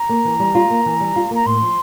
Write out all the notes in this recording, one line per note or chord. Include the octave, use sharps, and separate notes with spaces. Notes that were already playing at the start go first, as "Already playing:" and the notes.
Already playing: A#5
A#3
E3
G3
F4
A#3
E3
G3
F4
A#3 A#5
A2 C6
F3